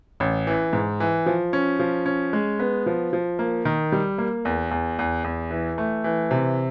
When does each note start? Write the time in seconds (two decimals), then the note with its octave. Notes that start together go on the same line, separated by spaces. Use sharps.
0.20 A1
0.47 E3
0.73 G#2
1.00 E3
1.26 F3
1.53 C#4
1.79 F3
2.06 C#4
2.33 G#3
2.59 B3
2.86 F3
3.13 F3
3.39 A#3
3.65 D#3
3.92 G3
4.18 A#3
4.45 E2
4.71 E2
4.99 E2
5.24 E2
5.51 E3
5.78 A3
6.04 E3
6.31 C3